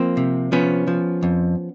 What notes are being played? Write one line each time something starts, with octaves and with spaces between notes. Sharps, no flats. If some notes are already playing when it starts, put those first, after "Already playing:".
Already playing: F3 A#3 C4
C3
F3 B3 C#4
F3
F2